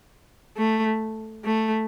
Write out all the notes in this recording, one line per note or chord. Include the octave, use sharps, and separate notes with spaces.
A3
A3